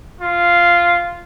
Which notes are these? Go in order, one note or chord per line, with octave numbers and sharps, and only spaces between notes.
F4